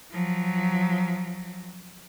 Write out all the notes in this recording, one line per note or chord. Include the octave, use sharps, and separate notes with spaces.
F3 F#3